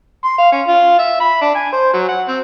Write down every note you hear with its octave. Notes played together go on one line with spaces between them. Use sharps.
C6
F5
C#4
F4
E5
B5
D4
G#5
C5
F#3
F#5
C4